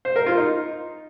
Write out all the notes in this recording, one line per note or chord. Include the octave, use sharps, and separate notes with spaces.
C5
A#4
F4
D#4